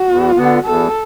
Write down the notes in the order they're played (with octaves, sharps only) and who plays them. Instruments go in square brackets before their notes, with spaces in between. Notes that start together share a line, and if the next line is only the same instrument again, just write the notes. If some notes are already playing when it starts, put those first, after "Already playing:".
Already playing: [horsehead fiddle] F#4
[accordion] E2
D3 B3
[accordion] E2 [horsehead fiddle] A4